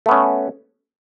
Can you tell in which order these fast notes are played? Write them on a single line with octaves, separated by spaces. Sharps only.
A3 B3 C#4